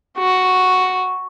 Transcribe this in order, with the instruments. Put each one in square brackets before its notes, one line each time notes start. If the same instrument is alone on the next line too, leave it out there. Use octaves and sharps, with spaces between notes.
[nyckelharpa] F#4